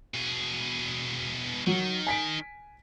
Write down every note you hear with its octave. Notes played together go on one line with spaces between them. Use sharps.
B2 G#4
D#3 F#3
G#5 B6 D7